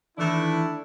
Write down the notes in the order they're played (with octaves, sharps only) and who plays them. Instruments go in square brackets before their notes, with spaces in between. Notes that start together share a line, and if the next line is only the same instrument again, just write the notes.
[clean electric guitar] D#3 E3 [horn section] A3 D4 E4